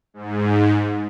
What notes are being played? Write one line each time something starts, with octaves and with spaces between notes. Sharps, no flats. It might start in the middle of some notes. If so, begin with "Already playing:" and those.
G#2